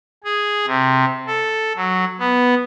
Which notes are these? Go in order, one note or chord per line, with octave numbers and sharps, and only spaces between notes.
G#4
C3
A4
F#3
B3